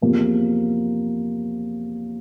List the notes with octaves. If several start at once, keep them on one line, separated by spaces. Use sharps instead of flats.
E2 C3 F3 A#3